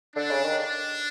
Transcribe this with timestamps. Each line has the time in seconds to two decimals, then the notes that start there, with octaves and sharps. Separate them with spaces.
0.15 D3 D4
0.30 C#3
0.44 D#3
0.59 D4